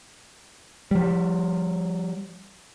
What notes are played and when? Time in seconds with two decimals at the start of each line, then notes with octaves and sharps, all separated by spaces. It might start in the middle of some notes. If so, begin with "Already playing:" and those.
0.91 F3 G3